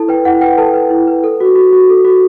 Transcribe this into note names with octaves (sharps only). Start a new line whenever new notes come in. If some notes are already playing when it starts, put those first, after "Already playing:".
Already playing: E4 A4 A5
B4 G5
E4 F#5
B4 G5
A4 B4 A5
B4
E4
B4
A4
F#4
F#4
F#4
A4
F#4